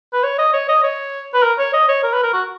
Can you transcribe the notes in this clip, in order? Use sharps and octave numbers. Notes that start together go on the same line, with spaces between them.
B4
C#5
D#5
C#5
D#5
C#5
B4
A#4
C#5
D#5
C#5
A#4
B4
A#4
F#4